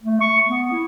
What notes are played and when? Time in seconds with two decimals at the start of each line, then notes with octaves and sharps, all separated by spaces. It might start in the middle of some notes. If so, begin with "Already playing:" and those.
0.03 A3
0.21 C#6
0.46 B3
0.72 E4